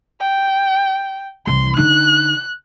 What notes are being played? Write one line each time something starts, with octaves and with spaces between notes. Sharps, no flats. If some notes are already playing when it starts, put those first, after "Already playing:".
G5
C2 E3 C6
D3 D#4 F#6